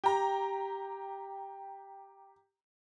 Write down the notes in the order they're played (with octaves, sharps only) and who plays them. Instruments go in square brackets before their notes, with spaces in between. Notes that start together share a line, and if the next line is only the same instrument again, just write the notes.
[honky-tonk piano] G4 A#5